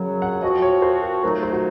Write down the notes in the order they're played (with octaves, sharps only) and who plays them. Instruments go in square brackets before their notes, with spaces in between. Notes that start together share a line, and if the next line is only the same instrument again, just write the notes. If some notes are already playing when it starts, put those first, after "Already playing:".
Already playing: [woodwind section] F#2 C#3 F#3
[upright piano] F#5
[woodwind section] F3 C4 F#4 [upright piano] D#5
[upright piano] C#5
C5
A#4
[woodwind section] F2 D#3 F#3 A3 D#4 [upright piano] A#4
[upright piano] C5
F#4